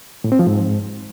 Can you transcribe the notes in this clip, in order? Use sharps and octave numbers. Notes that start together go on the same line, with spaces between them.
A2
C4
F3
G#2